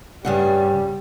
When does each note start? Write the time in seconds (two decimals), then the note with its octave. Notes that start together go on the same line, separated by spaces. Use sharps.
0.25 G2 C#3 G3 F#5